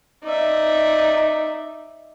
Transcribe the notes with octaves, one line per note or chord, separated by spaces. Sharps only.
D#4 D5 E5